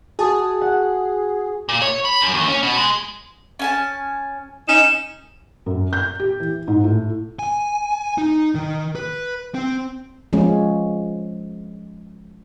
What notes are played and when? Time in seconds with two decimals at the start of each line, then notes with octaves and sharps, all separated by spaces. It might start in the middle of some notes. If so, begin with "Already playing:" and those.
0.19 F#4 G#4 G#5 A5 D#6
0.61 F#5
1.69 A#2
1.82 C#5
2.05 B5
2.20 F#2
2.34 D#2
2.48 C#4
2.63 B2
2.77 G#3
3.59 C#4 G#5 A5
4.68 C#4 D#4 E7
5.66 F#2
5.93 G6
6.20 G4
6.40 E3
6.68 G#2
6.84 A2
7.39 G#5
8.18 D#4
8.55 D#3
8.95 B4
9.54 C4
10.33 F3 G#3 C#4